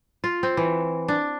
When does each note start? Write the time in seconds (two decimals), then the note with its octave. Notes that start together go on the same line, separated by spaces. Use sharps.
0.24 F4
0.43 C4
0.57 E3
1.08 D4